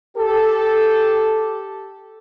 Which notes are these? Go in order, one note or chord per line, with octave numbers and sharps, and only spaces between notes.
G4 A4